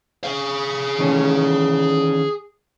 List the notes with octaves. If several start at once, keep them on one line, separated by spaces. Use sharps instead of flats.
G#4 F5
D#3 E3 C#4